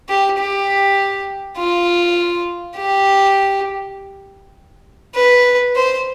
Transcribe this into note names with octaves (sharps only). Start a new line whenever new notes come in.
G4
G4
F4
G4
B4
C5